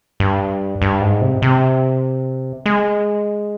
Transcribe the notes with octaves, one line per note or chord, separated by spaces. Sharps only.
G2
G2
G#2
C3
C3
G#3